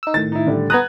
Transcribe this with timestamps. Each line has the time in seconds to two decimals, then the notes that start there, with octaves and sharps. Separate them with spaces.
0.03 D#4 E6
0.14 A2 D#3 A6
0.32 D#4 E4
0.47 D3 G3
0.70 B3 A#5 D#6 F#6 G#6